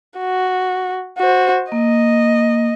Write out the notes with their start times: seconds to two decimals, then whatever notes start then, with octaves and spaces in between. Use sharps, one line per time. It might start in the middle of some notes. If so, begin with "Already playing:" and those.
0.19 F#4
1.18 F#4 C5
1.72 A#3 D#5